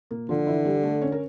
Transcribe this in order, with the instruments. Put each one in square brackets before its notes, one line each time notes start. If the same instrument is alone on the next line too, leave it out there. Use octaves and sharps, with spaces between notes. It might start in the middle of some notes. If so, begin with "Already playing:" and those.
[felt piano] A#2 A#3
[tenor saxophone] D3 [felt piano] F3 F4
[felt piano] E3 E4
G3 G4
A3 A4
C#4 C#5
A#4